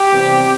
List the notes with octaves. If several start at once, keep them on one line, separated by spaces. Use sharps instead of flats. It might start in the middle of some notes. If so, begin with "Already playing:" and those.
Already playing: G4
C3 E3 G3 B3